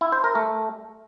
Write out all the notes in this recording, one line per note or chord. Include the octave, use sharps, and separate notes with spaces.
E4
C5
A#4
A3